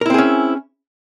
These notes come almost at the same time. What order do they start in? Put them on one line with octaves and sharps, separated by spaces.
A#4 E4 C4 G#4 C#4